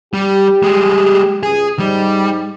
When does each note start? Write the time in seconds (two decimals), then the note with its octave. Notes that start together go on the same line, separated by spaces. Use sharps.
0.14 G3 G4
0.63 G3 G#3
1.43 C#2 G#4
1.79 G#2 G3 D#4 C5